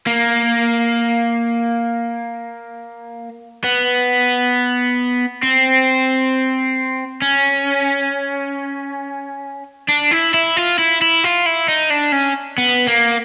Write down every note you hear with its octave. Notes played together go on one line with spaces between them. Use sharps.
A#3
B3
C4
C#4
D4
E4
E4
F4
E4
E4
F4
E4
D#4
D4
C#4
B3
A#3